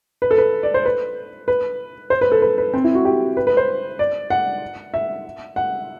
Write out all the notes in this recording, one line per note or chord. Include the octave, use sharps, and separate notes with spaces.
B4
A4
B4
D5
C5
B4
B4
C5
B4
A4
B4
B4
C4
E4
F#4
G4
B4
B4
C5
D5
F#5
E5
F#5